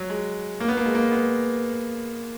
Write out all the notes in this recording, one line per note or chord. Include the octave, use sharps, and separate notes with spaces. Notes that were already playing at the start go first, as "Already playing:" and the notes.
Already playing: F#3
G#3
A#3
B3
A#3
G#3
A#3
B3